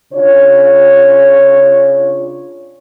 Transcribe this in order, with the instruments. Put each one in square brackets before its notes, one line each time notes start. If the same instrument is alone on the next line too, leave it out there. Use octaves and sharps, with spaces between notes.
[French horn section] C#3 D4 F4 C#5